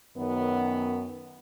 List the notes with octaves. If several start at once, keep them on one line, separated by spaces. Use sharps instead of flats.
F#2 D#3 B3